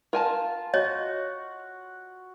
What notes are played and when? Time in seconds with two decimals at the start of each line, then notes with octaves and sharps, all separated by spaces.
0.13 F4 A#4 G#5 A5
0.74 F#4 C#5 D#5